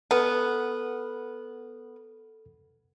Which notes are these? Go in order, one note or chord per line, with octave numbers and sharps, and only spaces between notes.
B3 A4 F#5 F6